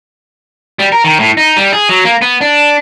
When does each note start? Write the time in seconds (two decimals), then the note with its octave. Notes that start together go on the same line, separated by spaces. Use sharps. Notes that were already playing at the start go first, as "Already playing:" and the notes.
0.79 G3
0.92 A#4
1.04 D#3
1.19 A2
1.37 D#4
1.57 G3
1.73 G#4
1.89 F#3
2.05 A#3
2.22 B3
2.41 D4